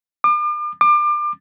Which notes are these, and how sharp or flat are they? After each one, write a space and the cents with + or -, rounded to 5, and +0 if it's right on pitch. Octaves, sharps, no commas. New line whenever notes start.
D6 +40
D6 +30